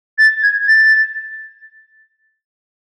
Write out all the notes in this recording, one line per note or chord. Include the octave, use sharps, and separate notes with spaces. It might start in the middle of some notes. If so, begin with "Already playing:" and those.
A6
G#6
A6